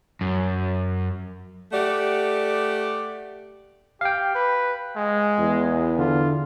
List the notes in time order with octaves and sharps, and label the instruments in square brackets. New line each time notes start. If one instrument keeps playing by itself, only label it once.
[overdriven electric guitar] F#2
[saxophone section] A3 G4 D5 F#5
[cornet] G4 [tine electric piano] F5 G5
[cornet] B4
G#3
[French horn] E2
[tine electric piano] D3 [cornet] F4